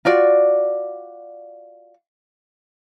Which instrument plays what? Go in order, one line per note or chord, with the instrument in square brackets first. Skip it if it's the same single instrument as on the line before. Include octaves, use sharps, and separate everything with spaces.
[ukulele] F4 F#4 D5